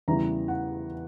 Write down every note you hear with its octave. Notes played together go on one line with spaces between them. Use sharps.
E2 C#3 E3 G3 A#5
F#5